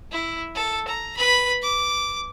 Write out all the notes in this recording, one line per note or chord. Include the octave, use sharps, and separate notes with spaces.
E4
A4
A#5
B4 B5
D6